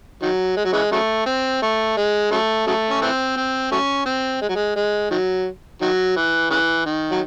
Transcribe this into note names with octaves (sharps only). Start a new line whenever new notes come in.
D#3 F#3
G#3
F#3
C#3 E3 G#3
C#3 F#3 A3
C4
A3
G#3
C#3 F#3 A3
C#3 F#3 A3
C#4
E3 A3 C4
C4
F#3 A3 C#4
C4
G#3
F#3
G#3
G#3
D#3 F#3
D#3 F#3
E3
C#3 E3
D#3
F#3